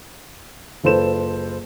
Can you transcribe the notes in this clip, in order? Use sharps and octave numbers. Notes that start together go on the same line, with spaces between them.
F#1 F4 A4 B4 C5 E7